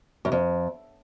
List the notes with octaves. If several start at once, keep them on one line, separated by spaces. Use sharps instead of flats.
F#2
F2